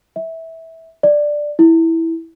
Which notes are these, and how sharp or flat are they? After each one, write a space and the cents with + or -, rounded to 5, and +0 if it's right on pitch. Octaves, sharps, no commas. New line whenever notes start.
E5 -15
D5 +5
E4 -5